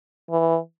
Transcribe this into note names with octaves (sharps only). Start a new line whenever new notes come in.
E3